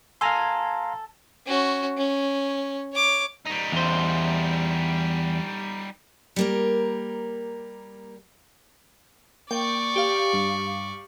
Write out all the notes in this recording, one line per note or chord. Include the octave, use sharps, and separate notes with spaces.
A4 F5 G#5 A#5 C6
C#4 F#4
C#4
C#5 D6
G3 D#4
E2 C5
G3 A#3 A#4
A#3 D5 G5 C#6
G4 F5
G2